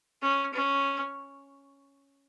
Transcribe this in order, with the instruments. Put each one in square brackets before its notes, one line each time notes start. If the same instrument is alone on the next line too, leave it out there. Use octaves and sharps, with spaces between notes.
[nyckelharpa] C#4
C#4